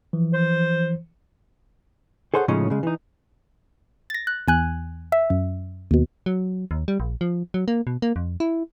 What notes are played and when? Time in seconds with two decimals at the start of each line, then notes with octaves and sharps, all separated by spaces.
0.13 E3 F3
0.33 C5
2.34 G#4 A4 C5 C#5 F#5
2.48 A2 C#3 F3 G#3 C#4 D#4
2.70 C#3 G#3
2.83 E3 D#4
4.10 A6 A#6
4.27 F#6
4.48 E2 G#5 F#6
5.12 E5
5.30 F#2
5.91 D#2 B2
6.26 F#3
6.71 D#2
6.88 G3
7.00 A#1
7.21 F3
7.54 F#3
7.68 A#3
7.87 B2
8.02 A#3
8.16 F2
8.40 E4